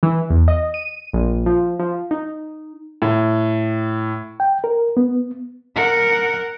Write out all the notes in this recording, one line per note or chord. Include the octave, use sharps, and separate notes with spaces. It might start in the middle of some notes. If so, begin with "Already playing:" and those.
E3
E2
D#5
D#7
A#1
F3
F3
D#4
A2
G5
A#4
B3
A#4 F#5